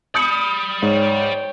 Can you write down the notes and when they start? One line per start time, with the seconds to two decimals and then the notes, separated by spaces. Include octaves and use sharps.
0.15 D5 B5 D#6 G6 C#7
0.83 G#2 C#5 G5